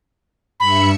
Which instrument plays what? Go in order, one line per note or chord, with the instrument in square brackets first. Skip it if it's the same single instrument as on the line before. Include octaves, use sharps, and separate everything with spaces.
[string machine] G2 E5 C#7 [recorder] B5